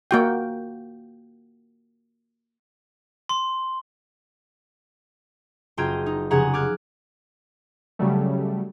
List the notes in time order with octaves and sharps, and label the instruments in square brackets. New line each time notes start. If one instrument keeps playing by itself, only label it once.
[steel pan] A#3 F#4 G5
[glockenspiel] C6
[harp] F#1 F4 G5 A#5 G#6 D#7
D#4
F1 C#3 G#4 F#5 G#5 A#5
D6 F6 F#6 G#6
[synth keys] C#3 F#3 G3 A3